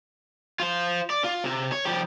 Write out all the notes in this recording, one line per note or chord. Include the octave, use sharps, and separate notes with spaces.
F4 C5
D5
F4
C3
C#5
F3 G4